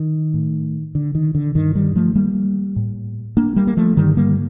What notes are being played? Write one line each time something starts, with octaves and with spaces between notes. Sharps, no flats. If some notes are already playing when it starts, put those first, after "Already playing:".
Already playing: D#3
A2
D3
D#3
D3
G2 D3 D#3
D#3 G3
F3 A3
G3 A#3
A2
A#3 D4
G3 A#3
A#3
F3 A3
G2 D3 D#3 G3
G3 A#3